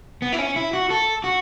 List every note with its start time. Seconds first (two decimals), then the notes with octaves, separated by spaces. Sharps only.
0.22 B3
0.33 E4
0.39 C#4
0.56 E4
0.73 F#4
0.90 A4
1.24 F#4